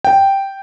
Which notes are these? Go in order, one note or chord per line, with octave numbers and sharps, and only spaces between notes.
G5